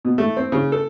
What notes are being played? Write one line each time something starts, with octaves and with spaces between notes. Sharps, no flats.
B2
A3
C4
C#3
A4